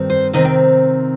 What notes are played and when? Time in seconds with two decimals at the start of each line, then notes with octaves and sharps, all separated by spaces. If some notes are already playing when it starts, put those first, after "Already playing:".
Already playing: G2 D#3 C4
0.10 C5
0.33 C3 D#3 C4 D#5
0.45 G5